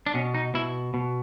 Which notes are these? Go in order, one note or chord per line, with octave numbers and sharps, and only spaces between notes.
D4
B2 C#4
D#4
B2 E4
B2